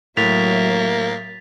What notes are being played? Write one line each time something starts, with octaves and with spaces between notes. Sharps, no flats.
A2 F#3 A#3 E5 A6 B6 F7